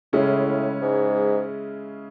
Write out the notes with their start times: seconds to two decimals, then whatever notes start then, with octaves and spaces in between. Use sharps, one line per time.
0.13 A2 C#3 G#3 C#4 E4
0.81 G#2